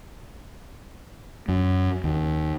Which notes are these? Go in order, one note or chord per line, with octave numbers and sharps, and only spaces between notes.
F#2
D#2